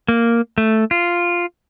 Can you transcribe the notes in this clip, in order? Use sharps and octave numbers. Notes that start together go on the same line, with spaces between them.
A#3
A3
F4